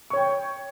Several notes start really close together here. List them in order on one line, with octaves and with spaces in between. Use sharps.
C#6 C#5 G5